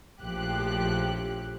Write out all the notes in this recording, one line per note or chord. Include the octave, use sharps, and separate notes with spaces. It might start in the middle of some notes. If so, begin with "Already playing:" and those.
A#1 A2 F3 G4 F#6